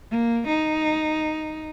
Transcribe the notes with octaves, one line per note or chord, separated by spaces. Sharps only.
A#3
D#4